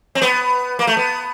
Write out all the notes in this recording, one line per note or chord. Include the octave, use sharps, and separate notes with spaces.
C4
B3
A#3
A3
B3